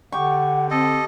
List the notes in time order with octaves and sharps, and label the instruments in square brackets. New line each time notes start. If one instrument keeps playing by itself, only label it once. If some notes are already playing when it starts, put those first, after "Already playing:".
[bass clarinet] D3 [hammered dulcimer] G4 C#6 [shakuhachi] F#5
[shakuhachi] C4 [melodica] A4 D#5